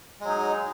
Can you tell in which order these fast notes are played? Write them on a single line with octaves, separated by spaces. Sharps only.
G#3 F#3 D#4